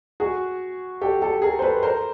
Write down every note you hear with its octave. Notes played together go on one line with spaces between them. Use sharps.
F#4 G#4
G4 A4
G4 A4
G#4 A#4
C5
A4 B4
A#4 C5